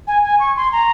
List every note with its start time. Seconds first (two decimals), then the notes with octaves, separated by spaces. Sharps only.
0.07 G#5
0.23 G#5
0.40 C#6
0.56 C6
0.72 A#5